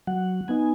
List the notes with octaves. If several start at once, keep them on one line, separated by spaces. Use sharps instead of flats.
F#3 F#5
B3 D#4 G#5